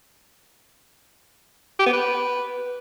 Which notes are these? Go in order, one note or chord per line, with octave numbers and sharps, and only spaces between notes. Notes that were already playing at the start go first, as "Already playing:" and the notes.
G4
B3
B4